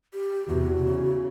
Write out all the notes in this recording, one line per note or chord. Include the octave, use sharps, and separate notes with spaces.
G4
E2 C3 F#4
C#3